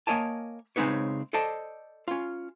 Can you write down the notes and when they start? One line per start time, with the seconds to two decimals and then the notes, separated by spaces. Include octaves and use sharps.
0.07 A#3 A#4 C#5 D#5 G#5 A5
0.76 C#3 G#3 C4 D#4 B4 C#5
1.33 A4 C5 D5 D#5 A5
2.08 C#4 F4